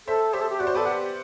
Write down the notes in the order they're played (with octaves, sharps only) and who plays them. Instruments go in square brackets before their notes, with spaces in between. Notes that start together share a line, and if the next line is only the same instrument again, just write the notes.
[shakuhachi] A4 [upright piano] C5 E5
[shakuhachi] G4 [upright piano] C5 E5
[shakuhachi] A4
G4
[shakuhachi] F#4 [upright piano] D5
[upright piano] C5
[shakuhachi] A4 [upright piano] B4 D5
[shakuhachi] G4 [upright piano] D5 F#5